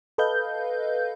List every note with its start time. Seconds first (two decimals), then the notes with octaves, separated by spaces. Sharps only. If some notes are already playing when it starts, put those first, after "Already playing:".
0.18 A4 B4 D#5 F5 G6